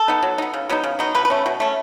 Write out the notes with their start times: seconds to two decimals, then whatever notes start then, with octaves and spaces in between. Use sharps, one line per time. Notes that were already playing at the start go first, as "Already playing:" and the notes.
Already playing: A4
0.08 B3 D#4
0.23 F#3
0.38 B3 D#4
0.54 C#3
0.69 F#3 B3 D#4
0.84 C#3
0.99 F#3 B3 D#4
1.15 B2 B4
1.25 B4
1.30 A3 C#4
1.46 B2
1.60 A3 C#4